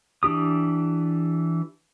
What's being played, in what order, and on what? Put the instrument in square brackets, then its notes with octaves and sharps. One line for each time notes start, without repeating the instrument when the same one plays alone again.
[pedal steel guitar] E3 D4 G4 D#6